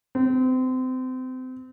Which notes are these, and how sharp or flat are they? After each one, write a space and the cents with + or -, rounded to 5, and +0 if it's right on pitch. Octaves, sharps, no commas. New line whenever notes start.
C4 -30